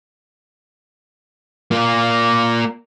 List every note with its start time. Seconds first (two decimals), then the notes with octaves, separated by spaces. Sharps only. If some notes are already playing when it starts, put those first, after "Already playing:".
1.71 A#3 F4